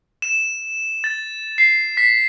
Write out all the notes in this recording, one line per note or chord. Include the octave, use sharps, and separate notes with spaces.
E7
A6
C7
B6